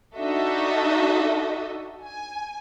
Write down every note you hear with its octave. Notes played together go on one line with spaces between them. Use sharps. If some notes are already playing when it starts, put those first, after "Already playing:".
D4 D#4 F#4 A4 D#5 E5
G#5